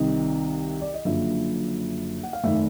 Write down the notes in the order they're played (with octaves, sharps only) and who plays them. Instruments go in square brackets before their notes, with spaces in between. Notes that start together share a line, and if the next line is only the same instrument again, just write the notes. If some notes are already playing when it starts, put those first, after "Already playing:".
Already playing: [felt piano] C2 C3 D#3 D#5
D5
D#5
F#1 F#2 D3 F3 E5
F#5
F5
F1 D#3 E5